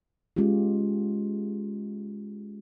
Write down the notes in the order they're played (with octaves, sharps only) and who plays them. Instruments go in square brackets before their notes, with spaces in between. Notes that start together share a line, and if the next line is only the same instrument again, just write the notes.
[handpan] G#3 C#4 F4 G4